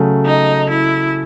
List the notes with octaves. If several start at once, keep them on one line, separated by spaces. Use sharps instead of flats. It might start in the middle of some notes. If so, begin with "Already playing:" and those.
Already playing: C#3 F#3 A3
D#4
E4